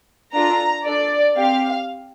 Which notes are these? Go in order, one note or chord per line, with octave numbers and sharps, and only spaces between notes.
D4 F4 A4 A#5
D4 A4 D5
C4 G4 F5